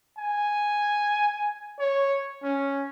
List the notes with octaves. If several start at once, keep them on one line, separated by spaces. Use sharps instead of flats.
G#5
C#5
C#4